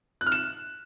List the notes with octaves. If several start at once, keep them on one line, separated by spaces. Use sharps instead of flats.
F#6
F6
E7